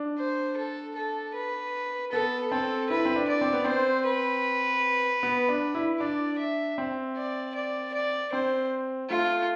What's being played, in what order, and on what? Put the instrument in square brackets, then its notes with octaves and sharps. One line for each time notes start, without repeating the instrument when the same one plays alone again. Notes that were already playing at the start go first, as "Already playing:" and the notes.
Already playing: [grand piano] D4
[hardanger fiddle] C5
A4
A4
B4
[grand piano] B3 [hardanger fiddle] A4
[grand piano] C4 [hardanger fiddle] A4
[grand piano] E4 [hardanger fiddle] B4
[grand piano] C4
D4
[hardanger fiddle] D5
[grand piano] C4
B3
[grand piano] C4 [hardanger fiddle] C5
[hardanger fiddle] B4
[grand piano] B3
D4
E4
[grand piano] D4 [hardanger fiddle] D5
[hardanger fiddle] E5
[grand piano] C4
[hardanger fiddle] D5
D5
D5
[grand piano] C4 [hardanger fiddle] C5
[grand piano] A3 [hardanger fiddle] F4